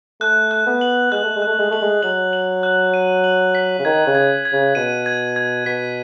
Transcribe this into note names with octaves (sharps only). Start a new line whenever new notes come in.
A3 F#6
F#6
B3
F#7
G#3 F#6
A3
G#3
A3 F#6
G#3
A3 F#7
G#3
F#3 F#7
F#7
F#6
D#7
F#7
B6
C#3
D#3 G#6
C#3
G#6
G#6
C#3
B2 D#7
G#6
G#6
B2 B6